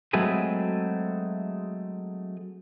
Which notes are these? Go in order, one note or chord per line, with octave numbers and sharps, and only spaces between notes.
F#3 G#3 A3 C4 G#4 B4